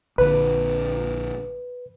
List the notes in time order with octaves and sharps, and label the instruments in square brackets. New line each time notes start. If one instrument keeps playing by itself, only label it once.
[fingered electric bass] A#1 D3 [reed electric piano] B4